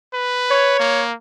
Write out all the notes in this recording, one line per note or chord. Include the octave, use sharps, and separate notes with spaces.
B4
C#5
A#3